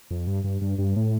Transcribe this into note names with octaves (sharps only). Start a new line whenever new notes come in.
F2
G2
G2
G2
G2
A2